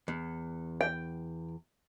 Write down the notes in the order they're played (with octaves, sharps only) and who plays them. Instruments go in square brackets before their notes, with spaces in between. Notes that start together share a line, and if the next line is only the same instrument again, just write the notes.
[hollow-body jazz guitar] E2
[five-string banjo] G5